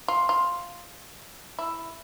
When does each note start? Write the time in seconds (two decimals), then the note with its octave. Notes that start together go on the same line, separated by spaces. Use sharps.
0.08 F4
0.29 F4
1.59 E4